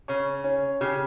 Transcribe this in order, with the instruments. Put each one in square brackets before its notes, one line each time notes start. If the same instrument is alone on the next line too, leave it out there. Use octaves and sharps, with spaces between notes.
[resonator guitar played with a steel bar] C#3 [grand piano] C#5
[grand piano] C#4
[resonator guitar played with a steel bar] C#3 [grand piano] G4